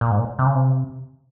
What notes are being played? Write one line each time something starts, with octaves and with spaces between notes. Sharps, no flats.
A#2
G#2
A#2
C3
C#3
C3